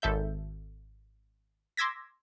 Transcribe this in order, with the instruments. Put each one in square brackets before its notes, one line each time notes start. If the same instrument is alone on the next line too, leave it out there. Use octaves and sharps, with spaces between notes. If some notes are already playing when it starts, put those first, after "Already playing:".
[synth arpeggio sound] G#1 A4 E5 G6
C6 D6 E6 G#6 A#6 B6